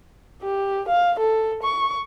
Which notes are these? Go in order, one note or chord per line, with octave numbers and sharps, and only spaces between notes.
G4
F5
A4
C#6